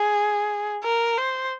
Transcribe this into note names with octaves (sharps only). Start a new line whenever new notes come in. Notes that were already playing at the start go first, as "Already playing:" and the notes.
Already playing: G#4
A#4
C5